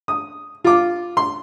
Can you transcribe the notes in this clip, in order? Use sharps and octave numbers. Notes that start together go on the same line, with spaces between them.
D#6
F4 D6
C6